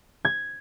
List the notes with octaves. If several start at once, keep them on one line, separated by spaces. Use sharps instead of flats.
G#6